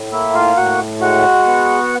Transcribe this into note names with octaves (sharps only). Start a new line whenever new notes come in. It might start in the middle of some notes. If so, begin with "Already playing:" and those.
Already playing: A2
A#3 E4 E5
F4 F5
A2 F#4 F#5
G#3 F#4 F#5
B3